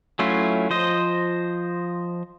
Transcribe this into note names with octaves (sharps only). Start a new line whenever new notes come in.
F#3 A3 C#4 E4 F4
F3 C5 D#5